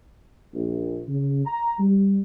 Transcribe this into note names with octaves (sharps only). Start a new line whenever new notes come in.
A#1
C#3
A#5
G3